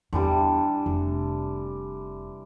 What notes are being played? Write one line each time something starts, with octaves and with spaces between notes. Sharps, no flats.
E2 D3 E3 G3
F1